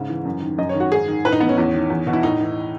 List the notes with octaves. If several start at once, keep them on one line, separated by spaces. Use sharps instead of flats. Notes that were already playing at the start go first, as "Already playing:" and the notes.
Already playing: G#2 C#3
E3
F#2
D#3
F#2 D#5
C#5
D#3
F#4
G#2 G#4
D#3
A2 B4
D#4
E3 B3
C#4
E2
D#3
E2
B2
E4
A2 D#4
E3